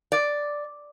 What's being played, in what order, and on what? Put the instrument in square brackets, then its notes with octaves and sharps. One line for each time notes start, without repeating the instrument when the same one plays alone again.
[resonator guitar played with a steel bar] D5